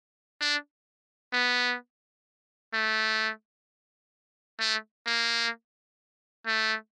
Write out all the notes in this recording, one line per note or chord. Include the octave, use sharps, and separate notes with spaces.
D4
B3
A3
A3
A#3
A3